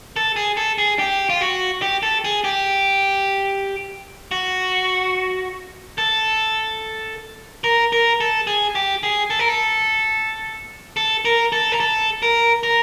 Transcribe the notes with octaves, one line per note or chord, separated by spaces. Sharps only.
A4
G#4
A4
G#4
G4
F4
F#4
G4
A4
G#4
G4
F#4
A4
A#4
A#4
A4
G#4
G4
G#4
A4
A#4
A4
A4
A#4
A4
A#4
A4
A#4
A#4